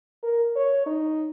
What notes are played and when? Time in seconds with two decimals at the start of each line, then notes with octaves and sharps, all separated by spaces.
0.23 A#4
0.56 C#5
0.86 D#4